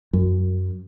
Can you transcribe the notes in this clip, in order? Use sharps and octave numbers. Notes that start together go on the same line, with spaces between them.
F#2